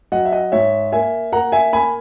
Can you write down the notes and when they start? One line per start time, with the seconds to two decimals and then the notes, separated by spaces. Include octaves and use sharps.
0.12 F#3 D#5 F#5
0.25 E5
0.32 D#5 F#5
0.52 G#2 C#5 E5
0.92 A#3 E5 G#5
1.32 A#3 F#5 A#5
1.52 E5 G#5
1.73 A#3 G#5 B5